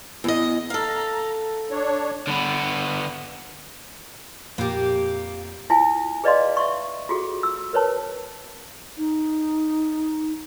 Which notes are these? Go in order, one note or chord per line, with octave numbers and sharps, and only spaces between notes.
E2 D#5
A4 F5 A#5
D4 C#5
D3 B3
F2 A#2 A#3 G4
E4 F4 G#5
G#4 B4 D5 D#5 F5 C6
E5 C6 C#6
F4 F#4 G#4 A4
E6
A#4 B4 C#5 A5
D#4